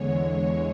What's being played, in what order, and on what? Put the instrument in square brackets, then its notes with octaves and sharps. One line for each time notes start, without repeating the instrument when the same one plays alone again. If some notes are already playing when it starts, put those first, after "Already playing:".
Already playing: [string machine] E2 D3 G#3 C#5